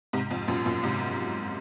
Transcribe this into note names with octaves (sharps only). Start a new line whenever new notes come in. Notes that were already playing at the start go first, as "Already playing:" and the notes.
G#2 C3
F2 G#2
F#2 A#2
F#2 A#2
G#2 C3